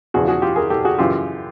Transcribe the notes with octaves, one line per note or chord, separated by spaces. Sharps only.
E2 C#3 F3 F#4 G#4
F#4 G#4
F4 G4
G#4 A#4
G4 A4
F#4 G#4
F#2 C#3 E3 F4 G4